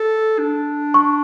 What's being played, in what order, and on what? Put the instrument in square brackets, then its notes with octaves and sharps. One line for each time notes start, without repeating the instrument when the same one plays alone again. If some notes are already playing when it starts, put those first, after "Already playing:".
Already playing: [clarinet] A4
D4
[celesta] C#6